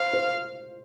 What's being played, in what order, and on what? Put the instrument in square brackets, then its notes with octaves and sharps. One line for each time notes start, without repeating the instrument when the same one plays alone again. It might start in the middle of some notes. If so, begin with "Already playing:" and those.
Already playing: [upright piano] C5 [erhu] F5
[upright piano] C5